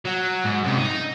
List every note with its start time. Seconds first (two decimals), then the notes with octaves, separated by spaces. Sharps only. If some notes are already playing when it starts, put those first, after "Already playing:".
0.05 F#3
0.45 G#2
0.64 F#2 C3
0.79 D#4